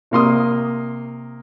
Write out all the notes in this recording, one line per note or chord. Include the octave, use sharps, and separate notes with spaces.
C3 A#3 C6 D#6